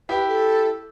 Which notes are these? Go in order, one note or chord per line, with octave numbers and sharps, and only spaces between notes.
E4 G4 B4
A4